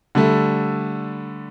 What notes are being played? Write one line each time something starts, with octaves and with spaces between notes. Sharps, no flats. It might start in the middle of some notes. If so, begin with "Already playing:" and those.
D3 G3 A3